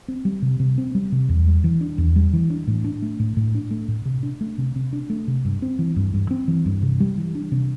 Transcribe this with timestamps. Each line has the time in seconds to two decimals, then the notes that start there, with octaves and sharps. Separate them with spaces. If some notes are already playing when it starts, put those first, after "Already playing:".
0.08 C4
0.25 G3
0.42 C3
0.60 C3
0.78 C4
0.95 G3
1.12 C3
1.29 E2
1.47 G3
1.64 E3
1.81 D4
1.98 E2
2.16 G3
2.33 E3
2.50 D4
2.67 A2
2.84 D4
3.02 A3
3.19 A2
3.37 A2
3.55 D4
3.71 A3
3.88 A2
4.05 C3
4.23 D4
4.41 A3
4.58 C3
4.76 C3
4.93 D4
5.10 A3
5.28 C3
5.45 G2
5.62 C4
5.79 E3
5.96 G2
6.14 G2
6.31 C4
6.48 E3
6.66 G2
6.82 C3
7.00 G3
7.18 E3
7.35 D4
7.52 C3